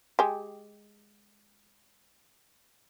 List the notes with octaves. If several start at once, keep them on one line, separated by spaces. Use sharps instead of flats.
G#3 G4